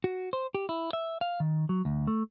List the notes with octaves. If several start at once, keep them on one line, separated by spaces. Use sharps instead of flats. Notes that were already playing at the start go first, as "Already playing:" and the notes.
F#4
C5
G4
E4
E5
F5
D#3
F#3
D2
A3